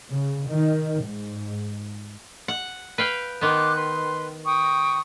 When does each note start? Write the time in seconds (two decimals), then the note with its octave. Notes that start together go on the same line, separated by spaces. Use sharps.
0.11 C#3
0.47 D#3
1.03 G#2
2.48 F#5
2.98 B4 F5 G5
3.41 D#3 B3 C6 D6 F#6
3.76 B4 C6
4.45 G5 C#6 D#6